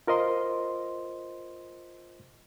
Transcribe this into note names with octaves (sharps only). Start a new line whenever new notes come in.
F4 A#4 C5 D#5 C6